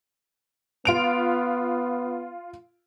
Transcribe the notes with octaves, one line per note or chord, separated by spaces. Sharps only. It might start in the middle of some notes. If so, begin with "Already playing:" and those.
B3 F4 D7 F7